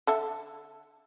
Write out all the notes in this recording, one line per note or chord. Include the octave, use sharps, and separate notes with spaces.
D3 A4 E5